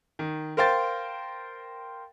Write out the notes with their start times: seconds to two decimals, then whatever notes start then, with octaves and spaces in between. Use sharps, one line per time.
0.19 D#3
0.57 A#4 C5 F5 G5 A6